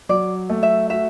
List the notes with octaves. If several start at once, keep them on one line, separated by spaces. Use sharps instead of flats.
F#3 D5
A3
E5
F#4 E5